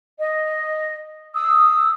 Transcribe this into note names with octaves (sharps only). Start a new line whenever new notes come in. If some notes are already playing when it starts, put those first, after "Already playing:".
D#5
D#6 E6